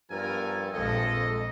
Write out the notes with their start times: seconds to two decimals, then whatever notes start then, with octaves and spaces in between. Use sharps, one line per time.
0.10 G2 F3 B3 A4 A#4 G#5
0.74 A#1 F2 G#3 A4 D#5